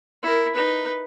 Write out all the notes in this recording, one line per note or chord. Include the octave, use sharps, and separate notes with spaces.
E4 A#4
D#4 B4